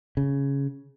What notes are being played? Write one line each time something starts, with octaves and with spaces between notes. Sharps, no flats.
C#3